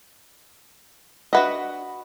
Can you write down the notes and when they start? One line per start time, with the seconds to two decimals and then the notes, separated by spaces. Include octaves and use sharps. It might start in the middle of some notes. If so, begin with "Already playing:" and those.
1.33 D4 F#4 B4 D#5 E5 F#5